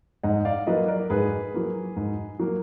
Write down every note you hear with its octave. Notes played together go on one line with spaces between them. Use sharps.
G#2 D#5 F#5
D5 F5
F#3 A#3 B4 D#5
A#4 D5
G#2 G#4 B4
F#3 A#3
G#2
F#3 A#3